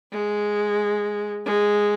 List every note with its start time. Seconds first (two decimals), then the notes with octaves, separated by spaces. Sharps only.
0.11 G#3
1.45 G#3